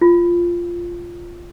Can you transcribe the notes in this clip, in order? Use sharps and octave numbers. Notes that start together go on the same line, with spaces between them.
F4